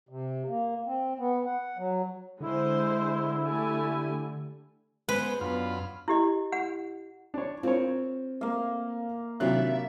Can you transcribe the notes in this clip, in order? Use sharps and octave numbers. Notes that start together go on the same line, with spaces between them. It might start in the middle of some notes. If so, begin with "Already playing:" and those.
C3
A#3
C4
B3
F#5
F#3
D3 G#3 E4 C5
A3 G4 G#5
G#3 B3 B4 C5
F#2 B3 D4 F4 B5 F6
E4 G4 D#5
F#5
D4 C#5
C4 F4 A#4 C#5
A#3 F5
C2 D#3 F#3 D4 F4 E5 F#6